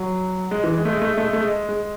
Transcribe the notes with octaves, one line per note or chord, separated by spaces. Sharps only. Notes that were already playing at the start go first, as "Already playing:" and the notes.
Already playing: F#3
G#3
E3
G#3
A3
G#3
A3
G#3
A3
G#3
A3
G#3
G#3